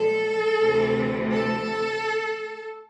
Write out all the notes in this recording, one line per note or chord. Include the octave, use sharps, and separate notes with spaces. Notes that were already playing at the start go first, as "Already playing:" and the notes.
Already playing: A#2 F3 G#3 A4
D2 C3 E3 A3
A4